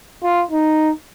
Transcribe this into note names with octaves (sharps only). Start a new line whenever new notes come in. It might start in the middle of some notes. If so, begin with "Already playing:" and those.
F4
D#4